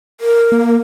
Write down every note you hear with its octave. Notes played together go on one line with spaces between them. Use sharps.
A#4
A#3